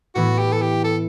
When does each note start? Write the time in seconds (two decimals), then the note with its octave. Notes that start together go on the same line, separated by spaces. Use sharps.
0.15 A2 E3 B3 E4 F#4
0.39 G4
0.52 A4
0.61 G4
0.84 A4